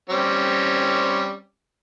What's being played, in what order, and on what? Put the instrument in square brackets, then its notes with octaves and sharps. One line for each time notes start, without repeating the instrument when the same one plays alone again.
[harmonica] G3 C4 C#4